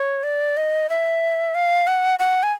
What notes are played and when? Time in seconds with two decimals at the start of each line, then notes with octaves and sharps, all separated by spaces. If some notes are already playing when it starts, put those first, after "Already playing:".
Already playing: C#5
0.23 D5
0.57 D#5
0.90 E5
1.55 F5
1.87 F#5
2.19 F#5
2.43 G#5